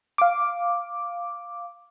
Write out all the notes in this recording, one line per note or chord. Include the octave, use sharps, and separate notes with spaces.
F5 D6